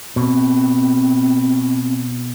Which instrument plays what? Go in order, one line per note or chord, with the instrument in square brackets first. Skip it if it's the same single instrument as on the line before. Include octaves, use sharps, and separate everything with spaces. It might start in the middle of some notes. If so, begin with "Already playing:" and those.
[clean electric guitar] B2 [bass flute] C4